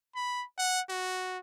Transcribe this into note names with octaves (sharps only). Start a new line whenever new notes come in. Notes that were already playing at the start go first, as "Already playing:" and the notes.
B5
F#5
F#4